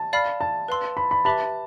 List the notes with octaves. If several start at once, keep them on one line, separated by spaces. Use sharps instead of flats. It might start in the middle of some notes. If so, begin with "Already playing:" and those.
Already playing: A5
D5 F5 B5 F6
A5
B4 F5 C6 E6
B5
B5
G4 B4 E5 A5 B5 D6